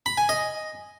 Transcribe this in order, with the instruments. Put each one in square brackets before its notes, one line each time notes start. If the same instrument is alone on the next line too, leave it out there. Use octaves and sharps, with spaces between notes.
[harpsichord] B5
G#5
D#5